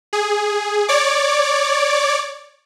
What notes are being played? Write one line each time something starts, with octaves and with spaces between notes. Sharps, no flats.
G#4
C#5 D5 D6